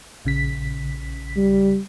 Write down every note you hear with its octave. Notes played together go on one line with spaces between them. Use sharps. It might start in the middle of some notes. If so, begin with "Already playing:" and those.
A#1 C#3 B6
G3